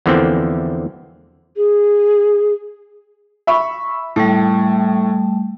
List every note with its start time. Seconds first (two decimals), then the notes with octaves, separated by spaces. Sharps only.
0.06 E2 D3 E3 F3 A#3 C4
1.57 G#4
3.47 E5 B5 C#6
4.16 A2 G3 A3